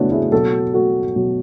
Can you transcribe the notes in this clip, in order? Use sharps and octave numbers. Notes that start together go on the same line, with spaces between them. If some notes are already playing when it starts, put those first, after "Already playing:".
Already playing: C#3 A3 B3 C#4 D4 E4 F#4
E4 G#4
B2 F#3 F#4 A4
F#4 A4
B2 F#3